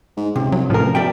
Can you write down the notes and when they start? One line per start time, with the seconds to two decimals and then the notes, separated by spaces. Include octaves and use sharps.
0.17 G#2
0.36 C#2 C3
0.52 C2 F#3
0.70 A1 A2 F3 A#4
0.95 B2 D5 E5 G5